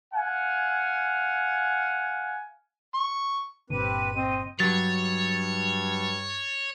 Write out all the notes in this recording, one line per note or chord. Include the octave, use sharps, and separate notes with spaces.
F5 F#5 G#5
C#6
G1 A#2 D3 C4 G4 B4 D#7
C4 D#5
G2 F#3 C#5 A6